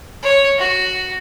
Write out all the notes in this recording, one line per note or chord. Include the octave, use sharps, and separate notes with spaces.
C#5
F#4